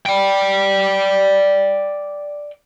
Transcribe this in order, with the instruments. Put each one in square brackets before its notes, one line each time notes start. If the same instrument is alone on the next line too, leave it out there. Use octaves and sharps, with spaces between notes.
[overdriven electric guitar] D5 G5